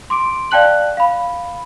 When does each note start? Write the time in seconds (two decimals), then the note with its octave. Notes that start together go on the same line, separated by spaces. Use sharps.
0.10 C6 D6 D7
0.51 D5 F5 G5 A5 F#6 F#7
0.97 F5 B5